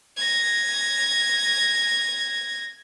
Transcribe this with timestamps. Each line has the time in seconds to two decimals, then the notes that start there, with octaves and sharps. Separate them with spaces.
0.17 G#6 A#6